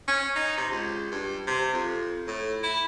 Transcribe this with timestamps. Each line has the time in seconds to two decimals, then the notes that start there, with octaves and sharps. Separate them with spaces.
0.08 C#4
0.36 D#4
0.57 C3
0.71 C#2
1.11 G2
1.47 C3
1.73 F2
2.27 A2
2.63 E4